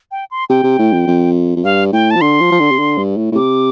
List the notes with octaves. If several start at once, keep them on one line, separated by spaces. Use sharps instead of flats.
G5
C6
C3 G5
C3
A2
F2
F2
F2
G2 F5
A2 G5
A5
F3
D3 C6
F3
F3
D3
C3
D3
G2
A2
A2
C3 D6